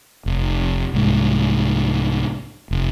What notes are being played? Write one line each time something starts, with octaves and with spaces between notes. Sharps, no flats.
F1
C2 G#2
F1